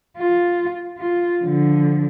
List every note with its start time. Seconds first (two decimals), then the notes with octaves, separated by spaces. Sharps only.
0.17 F4
0.98 F4
1.41 D3 F3